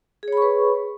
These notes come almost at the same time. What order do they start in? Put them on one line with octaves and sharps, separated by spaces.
G#4 C#5 B5 C#6 B4